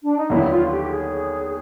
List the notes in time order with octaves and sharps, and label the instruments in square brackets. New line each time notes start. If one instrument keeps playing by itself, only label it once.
[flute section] D4
D#4
[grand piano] D#2 D3 F#3 B3 [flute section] E4
[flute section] E4
F4
G4
G#4